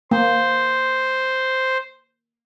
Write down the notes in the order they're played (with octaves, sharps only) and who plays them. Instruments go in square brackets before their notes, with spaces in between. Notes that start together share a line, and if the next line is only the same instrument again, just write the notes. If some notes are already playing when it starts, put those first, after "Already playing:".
[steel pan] A#3 [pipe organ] C5